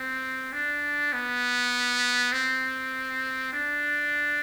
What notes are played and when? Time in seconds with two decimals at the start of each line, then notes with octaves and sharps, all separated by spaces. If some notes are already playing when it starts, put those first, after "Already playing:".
Already playing: C4
0.53 D4
1.13 B3
2.32 C4
3.53 D4